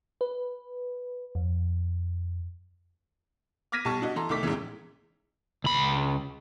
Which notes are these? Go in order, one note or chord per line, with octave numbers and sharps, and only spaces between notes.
B4
F2
D6 F6 G#6 A#6 B6 D#7
B1 G3 A5 C#6
D4 F#4 D#5
E3 A4 A#5 C6
C2 D#3 A3 D6 B6
A1 E2 G#2 C#3 E3
C#2 B5